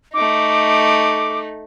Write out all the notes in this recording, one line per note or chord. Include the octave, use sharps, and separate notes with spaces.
A3 D#4 D6